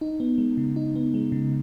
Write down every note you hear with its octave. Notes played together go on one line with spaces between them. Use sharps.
D#4
B3
G#3
C#3
D#4
B3
G#3
C#3